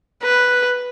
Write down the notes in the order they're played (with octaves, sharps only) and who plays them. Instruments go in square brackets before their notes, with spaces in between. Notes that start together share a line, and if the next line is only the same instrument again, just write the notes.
[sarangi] B4